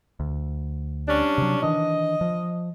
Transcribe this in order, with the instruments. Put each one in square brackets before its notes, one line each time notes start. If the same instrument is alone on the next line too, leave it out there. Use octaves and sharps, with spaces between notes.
[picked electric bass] D2
[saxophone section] G3 C#4 D4
[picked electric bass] C3 F#3
[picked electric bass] D#3 E3 D4 [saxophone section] D#5
[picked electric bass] F3